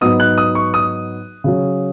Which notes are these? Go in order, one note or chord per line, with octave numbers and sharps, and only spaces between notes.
G#2 F#3 B3 D#4 D#6
F#6
D#6
C#6
D#6
C#3 F#3 C#4